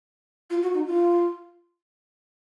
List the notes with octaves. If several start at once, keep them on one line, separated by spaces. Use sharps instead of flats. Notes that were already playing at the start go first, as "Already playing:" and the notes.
F4
F#4
D#4
F4